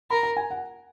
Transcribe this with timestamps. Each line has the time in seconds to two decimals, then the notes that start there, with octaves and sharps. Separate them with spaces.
0.10 A#4 B5
0.23 A#5
0.37 G#5
0.50 F#5